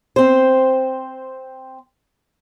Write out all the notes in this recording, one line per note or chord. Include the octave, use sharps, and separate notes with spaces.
C4 C5